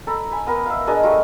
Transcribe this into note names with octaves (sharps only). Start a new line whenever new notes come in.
A4 A#5 B5
G#5 B5
B3 A#4
E5 F5
D4 G#4 A#4 D#5
G3 A3 F4